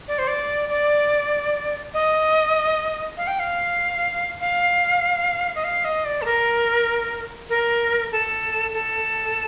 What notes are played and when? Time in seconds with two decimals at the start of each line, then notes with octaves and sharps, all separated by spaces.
0.08 D5
0.19 C5
0.28 D5
0.70 D5
1.94 D#5
3.17 F5
3.27 G5
3.39 F5
4.40 F5
5.55 D#5
5.64 F5
5.85 D#5
6.05 D5
6.22 A4
6.26 A#4
7.50 A#4
8.12 A4
8.73 A4